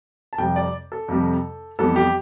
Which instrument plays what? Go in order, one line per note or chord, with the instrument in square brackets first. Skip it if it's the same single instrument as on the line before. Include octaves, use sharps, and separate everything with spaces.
[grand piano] A5
F2 C3 G3 G5
D5
A4
F2 C3 G3
F2 E3 G3 B3 A4
G4